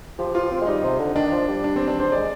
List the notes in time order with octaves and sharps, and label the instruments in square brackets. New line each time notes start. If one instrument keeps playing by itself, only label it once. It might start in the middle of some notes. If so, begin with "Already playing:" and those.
[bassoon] F3 [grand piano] G4
[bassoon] F3 [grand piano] F4
[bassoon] C4
G#3
[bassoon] G3 [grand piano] D#4
[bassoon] C3
D3
[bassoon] D#3 [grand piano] D4
[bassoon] D#3
F3
G3
[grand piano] D4
C4
D4
C5
[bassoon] G#3 [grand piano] D5